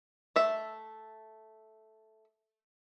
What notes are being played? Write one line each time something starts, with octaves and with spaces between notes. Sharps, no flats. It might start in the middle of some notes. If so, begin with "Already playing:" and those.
A3 E5